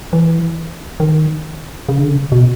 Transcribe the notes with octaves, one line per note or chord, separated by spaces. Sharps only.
E3
D#3
C#3
D3
C#3
B2